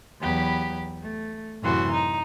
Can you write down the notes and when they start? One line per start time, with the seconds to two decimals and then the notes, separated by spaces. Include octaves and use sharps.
0.20 E2 F#3 B3 G4 B5
1.02 A3
1.62 F#2 A2 C3 E3 F#4 C6
1.91 D#4